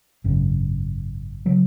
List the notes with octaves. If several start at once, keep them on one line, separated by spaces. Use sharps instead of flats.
G#1 F#2 C#3
C#3 F#3